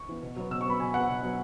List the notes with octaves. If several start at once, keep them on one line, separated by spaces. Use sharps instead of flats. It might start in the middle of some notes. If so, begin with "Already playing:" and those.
Already playing: C#6
E3 B3
B2
F#3 B3
B2 E6
C#6
F#3 B3 B5
B2 G#5
F#3 B3 F#5
B2
F#3 B3